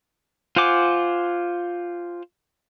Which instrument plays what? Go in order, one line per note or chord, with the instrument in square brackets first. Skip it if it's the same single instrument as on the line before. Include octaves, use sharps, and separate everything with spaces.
[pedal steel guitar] F4 C5 F#5 G#5 D6